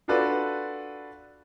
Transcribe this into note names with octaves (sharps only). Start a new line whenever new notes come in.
D4 F4 F#4 A4 B4 D5